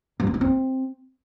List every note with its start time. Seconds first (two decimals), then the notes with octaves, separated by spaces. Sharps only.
0.20 G3
0.27 C4
0.34 D#4
0.41 C4